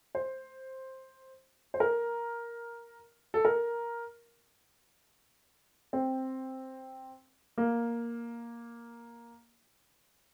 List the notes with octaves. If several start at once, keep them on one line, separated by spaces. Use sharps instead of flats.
C5
C5
A#4
A4
A#4
C4
A#3